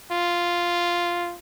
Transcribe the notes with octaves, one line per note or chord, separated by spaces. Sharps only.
F4